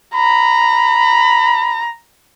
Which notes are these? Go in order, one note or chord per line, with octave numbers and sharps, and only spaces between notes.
A#5 B5